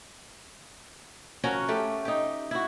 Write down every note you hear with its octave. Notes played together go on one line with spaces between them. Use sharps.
F3 C#4 F#4 A#4
A3 G4
D#4 G4
E4 F#4